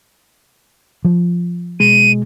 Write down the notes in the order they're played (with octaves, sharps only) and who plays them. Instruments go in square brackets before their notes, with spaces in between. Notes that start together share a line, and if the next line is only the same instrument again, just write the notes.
[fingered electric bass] F3
[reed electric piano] B2 G#3 [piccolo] D#7